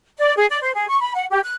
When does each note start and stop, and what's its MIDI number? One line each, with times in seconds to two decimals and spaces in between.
0.18 0.34 74
0.37 0.47 68
0.50 0.58 74
0.62 0.74 72
0.74 0.87 68
0.88 0.97 85
1.01 1.14 83
1.15 1.26 78
1.30 1.38 67
1.44 1.55 90